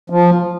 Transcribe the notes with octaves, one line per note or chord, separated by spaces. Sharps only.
F3